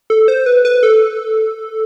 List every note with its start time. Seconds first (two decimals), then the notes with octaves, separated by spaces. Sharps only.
0.10 A4
0.28 C5
0.46 B4
0.65 B4
0.83 A4